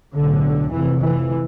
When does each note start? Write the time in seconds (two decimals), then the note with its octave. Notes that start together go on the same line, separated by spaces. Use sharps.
0.14 B1 A2 D3
0.71 F1 F2 C3 E3
0.99 E3